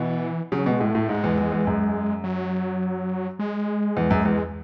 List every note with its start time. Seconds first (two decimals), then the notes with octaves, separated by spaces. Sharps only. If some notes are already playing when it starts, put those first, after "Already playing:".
Already playing: B2 E3
0.52 C#3 F#3
0.66 B2
0.71 G#3
0.81 A2
0.91 A2 A3
1.09 G#2 G#3
1.24 E2
1.38 E2
1.52 E2
1.67 F#2
2.24 F#3
3.39 G#3
3.97 E2
4.11 F#2
4.25 E2